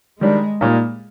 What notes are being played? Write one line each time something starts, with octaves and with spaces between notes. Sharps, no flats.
D#3 G3 G#3 D4
A#2 G3 A#3 D#4